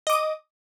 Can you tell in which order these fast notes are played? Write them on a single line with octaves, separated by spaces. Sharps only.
D#5 D6 D#6